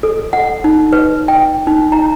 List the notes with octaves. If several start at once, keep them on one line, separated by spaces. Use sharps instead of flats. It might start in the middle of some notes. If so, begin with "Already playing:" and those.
A4
F#5
D#4
B4
G5
D#4
A#5